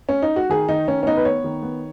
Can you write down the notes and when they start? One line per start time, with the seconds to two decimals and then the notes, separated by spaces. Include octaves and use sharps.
0.09 C#4
0.22 D#4
0.36 F#4
0.50 D#3 G#4
0.69 D#3 D#4
0.88 D#3 C#4
1.03 C#4
1.06 B3 D#4
1.17 B4
1.25 B3 C#5
1.44 D#3
1.62 B3